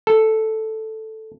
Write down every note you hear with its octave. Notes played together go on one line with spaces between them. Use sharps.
A4